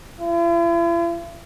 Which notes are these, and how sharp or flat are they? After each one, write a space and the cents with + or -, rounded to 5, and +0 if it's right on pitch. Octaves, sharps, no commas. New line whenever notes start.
E4 +45